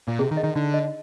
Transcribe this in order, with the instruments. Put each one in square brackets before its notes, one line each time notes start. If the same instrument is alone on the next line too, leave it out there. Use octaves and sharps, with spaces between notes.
[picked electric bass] A#2
[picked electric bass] C3 [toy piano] G#4
[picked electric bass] D#3
[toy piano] D#5
[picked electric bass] D#3
[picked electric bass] D3 [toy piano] D#4
[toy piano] D#5